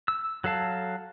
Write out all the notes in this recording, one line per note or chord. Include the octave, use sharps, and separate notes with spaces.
E6
F#3 A4 F5 A5